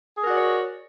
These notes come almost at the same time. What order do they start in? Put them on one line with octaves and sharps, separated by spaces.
G#4 A#4 F#4 D5 C#5